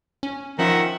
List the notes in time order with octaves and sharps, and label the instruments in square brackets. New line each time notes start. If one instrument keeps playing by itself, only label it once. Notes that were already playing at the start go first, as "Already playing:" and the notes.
[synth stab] C#4
[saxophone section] D#3 E5 F#5 [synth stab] F3 C#4 F4